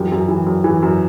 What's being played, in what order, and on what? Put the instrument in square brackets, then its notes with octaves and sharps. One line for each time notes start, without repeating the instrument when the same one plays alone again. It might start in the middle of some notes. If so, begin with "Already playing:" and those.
Already playing: [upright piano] F#2 E3 G4
F#2
E3
F#2
E3
F#2